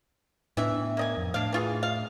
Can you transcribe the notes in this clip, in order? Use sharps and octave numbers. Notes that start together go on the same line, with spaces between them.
A2 E3 B3 D4 E5
A#3 D#5 G#5
F2
A2 D4 F5
E3 F4 G#4
F5